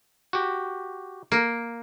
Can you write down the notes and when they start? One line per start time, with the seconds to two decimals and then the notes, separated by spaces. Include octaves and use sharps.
0.33 F#4 G4
1.32 A#3